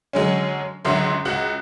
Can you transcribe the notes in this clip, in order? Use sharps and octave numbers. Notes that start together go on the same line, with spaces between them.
D3 F#3 G#3 C#4
C#2 D3 F#3 E5 C6
C#2 F#4 F#6